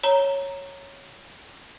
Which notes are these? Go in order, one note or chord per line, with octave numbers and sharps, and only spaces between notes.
C#5 A#5 G7